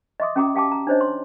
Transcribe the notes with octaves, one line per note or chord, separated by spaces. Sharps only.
D#5 E5 C6 D6 D#6
C#4 F#4 G5 A#5 D6 D#6
G4 F5 G5 A5 D6
A#5
D4 D#4 C5 C#5 D#5
C6